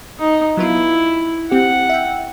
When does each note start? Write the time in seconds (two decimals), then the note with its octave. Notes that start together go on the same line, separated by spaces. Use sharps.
0.19 D#4
0.57 F#3 B3 E4 F4
1.51 C4 G4 F#5
1.89 E5 G5